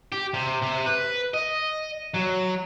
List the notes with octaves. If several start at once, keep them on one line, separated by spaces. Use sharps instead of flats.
G4
C3
C3
B4
D#5
F#3